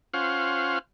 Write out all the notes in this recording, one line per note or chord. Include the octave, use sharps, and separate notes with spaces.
C#4 F4 C5 F5 F#5